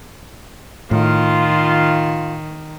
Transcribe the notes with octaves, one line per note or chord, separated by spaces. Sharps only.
A2 D#3 F4